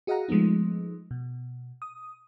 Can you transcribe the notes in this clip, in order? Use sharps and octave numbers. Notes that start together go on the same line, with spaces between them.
F#4 G#4 D#5 F5 F#5 A#5
F3 G#3 A3 B3 D#4
B2
D#6